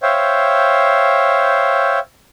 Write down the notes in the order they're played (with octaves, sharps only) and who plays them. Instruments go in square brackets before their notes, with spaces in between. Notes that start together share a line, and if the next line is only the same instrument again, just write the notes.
[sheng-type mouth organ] C5 C#5 E5 F5 G5